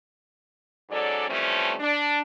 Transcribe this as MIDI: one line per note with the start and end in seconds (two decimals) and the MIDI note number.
0.90 1.28 44
0.90 1.28 54
0.90 1.28 61
0.90 1.28 69
0.90 1.28 74
1.29 1.74 52
1.29 1.74 53
1.29 1.74 55
1.29 1.74 57
1.29 1.74 60
1.29 1.74 61
1.80 2.19 62